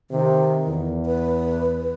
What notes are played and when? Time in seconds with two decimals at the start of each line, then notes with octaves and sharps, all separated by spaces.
0.10 C3 D#3
0.68 E2
1.06 B4